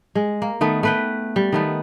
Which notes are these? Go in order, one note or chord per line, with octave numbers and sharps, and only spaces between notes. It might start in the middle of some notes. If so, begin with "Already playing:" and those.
G#3
A#3
D#3 A3 B3
A3 B4 G5
G3
D#3 A3 B3